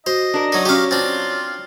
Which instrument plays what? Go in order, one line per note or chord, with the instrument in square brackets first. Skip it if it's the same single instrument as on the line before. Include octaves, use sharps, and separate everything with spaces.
[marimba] F#4 [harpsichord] C5 [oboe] D#5
[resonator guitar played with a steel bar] D4 A#4
[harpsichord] F#3 D#4
[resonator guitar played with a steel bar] F#3 C#4 [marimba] F#4 [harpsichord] G4 F5
[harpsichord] C4 D4 [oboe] F4